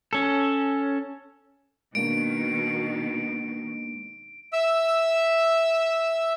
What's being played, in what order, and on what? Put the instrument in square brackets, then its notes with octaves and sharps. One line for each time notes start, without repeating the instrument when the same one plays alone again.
[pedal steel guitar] C#4 A4
[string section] B2 D#3 [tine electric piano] G#3 A#3 D4 [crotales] D7
[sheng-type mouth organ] E5 E6